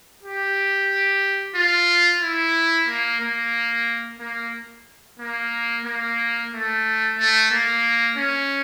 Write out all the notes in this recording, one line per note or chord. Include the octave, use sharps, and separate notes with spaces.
G4
F4
E4
A#3
A#3
A#3
A#3
A#3
A3
A3
A#3
C#4